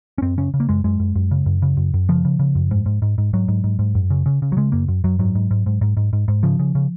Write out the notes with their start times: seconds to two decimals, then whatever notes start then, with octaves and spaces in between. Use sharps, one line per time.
0.18 C#4
0.22 F#2 C4
0.38 C#3 C#4
0.54 C#3
0.60 A#3
0.69 F#2 G#3
0.84 F#2 G#3
1.00 F#2
1.16 F#2
1.31 C#3
1.46 F#2
1.62 C#3
1.77 F#2
1.94 F#2
2.09 C#3 F3
2.25 C#3
2.39 C#3
2.55 F#2
2.71 G#2
2.86 G#2
3.02 G#2
3.18 G#2
3.33 G#2 F#3
3.48 G#2
3.64 G#2
3.79 G#2
3.95 F#2
4.10 C#3
4.26 C#3
4.42 C#3
4.52 F#3
4.57 C#3 G#3
4.72 F#2 A#3
4.88 F#2
5.04 F#2 F#3
5.19 G#2 F#3
5.35 G#2
5.51 G#2
5.66 G#2
5.81 G#2
5.97 G#2
6.13 G#2
6.28 G#2
6.43 C#3 F3
6.59 C#3
6.75 C#3